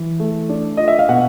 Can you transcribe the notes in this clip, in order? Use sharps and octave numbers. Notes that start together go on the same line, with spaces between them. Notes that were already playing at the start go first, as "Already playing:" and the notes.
Already playing: E3
A3
D4
F4 D#5
E5
F5
B2 F#5